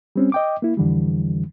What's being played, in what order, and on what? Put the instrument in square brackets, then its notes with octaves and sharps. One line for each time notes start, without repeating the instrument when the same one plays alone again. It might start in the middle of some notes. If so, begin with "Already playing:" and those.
[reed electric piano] G3 C4 C#4
D#5 G5 D6
A#3 E4
F2 D3 E3 G3